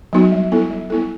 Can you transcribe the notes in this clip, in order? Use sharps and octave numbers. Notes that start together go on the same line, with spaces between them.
F#3 B3 D#4 F#4
G3
B3 E4 A4
G3
B3 E4 A4